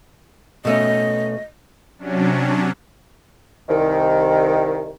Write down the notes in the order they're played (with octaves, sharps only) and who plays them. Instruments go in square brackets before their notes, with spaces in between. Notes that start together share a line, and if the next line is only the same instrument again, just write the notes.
[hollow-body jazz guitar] B2 A3 C#4 [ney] D#5
[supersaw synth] C3 F#3 C#4 D4
[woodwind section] C2 D#3